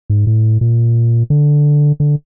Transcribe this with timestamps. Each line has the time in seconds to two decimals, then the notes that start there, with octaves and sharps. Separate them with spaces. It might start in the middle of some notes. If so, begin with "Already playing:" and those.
0.10 G#2
0.27 A2
0.61 A#2
1.30 D3
2.00 D3